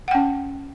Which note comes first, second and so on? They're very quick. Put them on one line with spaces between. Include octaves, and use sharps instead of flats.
F#5 G5 C#4